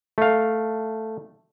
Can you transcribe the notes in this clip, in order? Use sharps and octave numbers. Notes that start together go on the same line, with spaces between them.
A3 F5